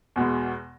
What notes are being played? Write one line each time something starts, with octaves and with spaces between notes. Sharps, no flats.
E2 B2 G#3